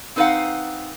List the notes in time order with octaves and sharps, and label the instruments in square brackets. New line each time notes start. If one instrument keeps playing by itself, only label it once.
[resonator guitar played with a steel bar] C4 D#4 B4 D5 F5 F#5